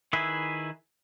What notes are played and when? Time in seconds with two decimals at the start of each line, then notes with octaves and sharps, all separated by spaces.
0.13 D#3 E4 G#4 B4 E5